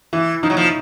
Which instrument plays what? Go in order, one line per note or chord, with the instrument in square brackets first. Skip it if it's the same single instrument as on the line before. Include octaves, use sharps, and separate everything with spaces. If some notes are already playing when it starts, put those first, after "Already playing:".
[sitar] E3 [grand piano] E4
[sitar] F3 [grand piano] D#4
[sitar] F#3
F3